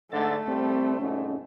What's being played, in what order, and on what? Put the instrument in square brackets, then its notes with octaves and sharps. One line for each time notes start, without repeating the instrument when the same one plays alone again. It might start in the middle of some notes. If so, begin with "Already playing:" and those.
[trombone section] G#2 D3 [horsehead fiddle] A3 [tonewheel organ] E5 A6
[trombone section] C2 G3 C5 [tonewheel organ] C4
[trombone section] C2 F2 G#2 [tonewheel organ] C#4